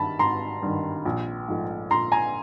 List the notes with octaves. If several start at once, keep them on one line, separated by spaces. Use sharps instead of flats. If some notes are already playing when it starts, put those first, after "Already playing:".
Already playing: G#1 G2 D#3 A5 B5
G#1 A#5 C6
G2 D#3
A#1
G#2 F3 A3
A#1 A#5 C6
G#5 A#5